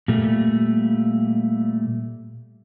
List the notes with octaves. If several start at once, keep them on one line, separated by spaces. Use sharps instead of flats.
A#2 G3 A3